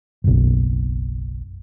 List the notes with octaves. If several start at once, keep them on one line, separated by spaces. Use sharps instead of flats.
F#1 B1